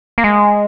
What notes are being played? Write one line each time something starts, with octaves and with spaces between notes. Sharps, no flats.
A#3
G#3